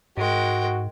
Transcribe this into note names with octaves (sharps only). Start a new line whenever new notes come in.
G#2 G#3 F#4 A#4 G5